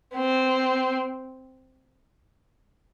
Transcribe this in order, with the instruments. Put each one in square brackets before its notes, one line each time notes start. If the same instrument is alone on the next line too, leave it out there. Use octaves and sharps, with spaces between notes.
[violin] C4